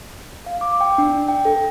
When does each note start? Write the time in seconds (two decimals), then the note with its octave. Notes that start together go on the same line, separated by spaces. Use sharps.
0.46 F5
0.61 D6
0.81 G5
0.98 D4
1.28 G5
1.45 A4